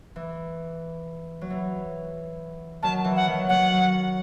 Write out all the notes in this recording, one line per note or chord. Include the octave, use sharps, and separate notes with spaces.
E3
F#3
E3
D#3 F#3 A5
E3
F#5
D#3 F#3
D#3 F#3 F#5